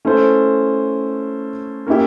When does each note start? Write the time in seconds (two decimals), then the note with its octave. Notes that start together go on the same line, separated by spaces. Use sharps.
0.05 A3 C#4 E4 A4 C5
1.87 A#3 C#4 E4 G4